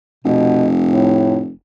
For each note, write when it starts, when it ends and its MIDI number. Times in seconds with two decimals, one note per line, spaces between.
0.25 1.52 29
0.25 0.67 47
0.87 1.39 45